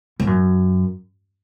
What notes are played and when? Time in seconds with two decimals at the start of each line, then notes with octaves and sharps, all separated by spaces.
0.20 G#2
0.27 F#2